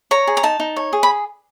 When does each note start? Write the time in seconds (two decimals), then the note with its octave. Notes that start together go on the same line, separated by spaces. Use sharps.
0.11 C#5 A#5
0.27 G#4
0.37 A#5
0.43 D#4 A5
0.60 D#4
0.76 C#5
0.93 G#4
1.03 B5